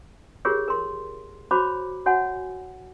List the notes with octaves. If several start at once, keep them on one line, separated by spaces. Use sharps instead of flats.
F4 G4 G#4 A#4 C#5
A#4 C6
F#4 C5 C#5 A#5 B5 D6
F#4 C#5 F#5 G#5